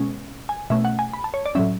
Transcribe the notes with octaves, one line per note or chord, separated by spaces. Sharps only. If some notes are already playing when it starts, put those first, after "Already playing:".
Already playing: B2 G#3 C#4
G#5
B2 A3 C#4 E5
F#5
G#5
B5
A5
C#5
D5
A2 F#3 C#4 E5